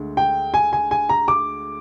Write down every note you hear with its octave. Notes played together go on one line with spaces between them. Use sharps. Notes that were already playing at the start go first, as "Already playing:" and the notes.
Already playing: D2 D3 G#3
G5
G#5
G#5
G#5
A#5
D6